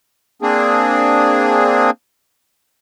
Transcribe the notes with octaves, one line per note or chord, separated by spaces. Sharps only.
A#3 C4 D4 G#4